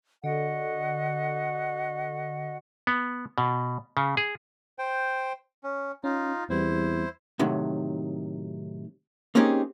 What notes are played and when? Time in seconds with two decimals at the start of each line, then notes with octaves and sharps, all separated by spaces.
0.24 D3 F#4 D#5 F#5
2.87 B3
3.38 B2
3.97 C#3
4.17 G#4
4.79 C5 G5
5.64 C#4
6.04 C#4 D#4 F4
6.50 E2 G3 B3 C4 E4 C5
7.39 A2 C3 D#3 F#3
9.35 A#3 C4 C#4 D#4 G4 G#4